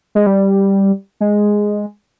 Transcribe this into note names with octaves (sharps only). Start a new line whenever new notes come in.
G#3
G3
G#3